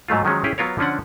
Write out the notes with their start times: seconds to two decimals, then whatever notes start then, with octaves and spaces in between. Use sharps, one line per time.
0.08 G#2 F#3 A3 F4
0.25 D#3 F3 F#3 G#3 C#4
0.44 C#4 E4 G4 G#4
0.58 F#3 B3 F4 A#4 C#5
0.78 D3 F3 C#4 D4 F#5